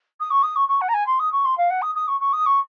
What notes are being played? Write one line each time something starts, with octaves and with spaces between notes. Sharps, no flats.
D#6
C#6
D#6
C#6
C#6
F#5
A#5
G#5
C6
D#6
C#6
C6
F5
F#5
D#6
D#6
C#6
C#6
D#6
C#6